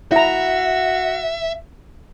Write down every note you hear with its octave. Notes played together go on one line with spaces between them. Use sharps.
E4 F#4 E5 A#5